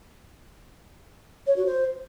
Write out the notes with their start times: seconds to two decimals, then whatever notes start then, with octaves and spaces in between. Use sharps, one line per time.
1.46 C#5
1.56 F#4
1.66 C5